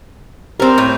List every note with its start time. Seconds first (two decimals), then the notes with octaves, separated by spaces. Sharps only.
0.60 C4 G4 A#4 C5
0.78 A2